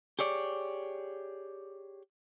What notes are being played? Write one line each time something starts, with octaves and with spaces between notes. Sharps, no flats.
G4 G#4 C#5 D5